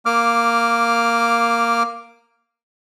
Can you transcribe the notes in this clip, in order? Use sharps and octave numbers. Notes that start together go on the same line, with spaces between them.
A#3 D6 F6